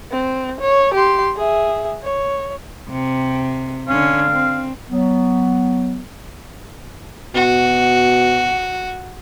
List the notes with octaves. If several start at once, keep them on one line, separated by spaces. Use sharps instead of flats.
C4
C#5
G4 C6
G#4 E5
C#5
C3
D3 C#4 F5
C4
F#3 B3
B2 F#4